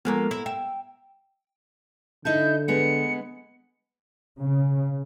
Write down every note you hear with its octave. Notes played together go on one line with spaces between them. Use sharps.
F3 G#3 A#3 B3 A4 A#5
E4
E5 G5
D3 D#4 E4 A4 G6
G#3 B3 G#4 C#7
C#3